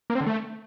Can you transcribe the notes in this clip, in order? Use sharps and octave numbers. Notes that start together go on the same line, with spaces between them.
A#3
C4
D3
A3